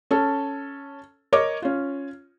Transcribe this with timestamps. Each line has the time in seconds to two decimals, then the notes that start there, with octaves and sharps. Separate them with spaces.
0.11 C#4 A4
1.33 A#4 C#5 D#5 D6
1.62 C#4 F4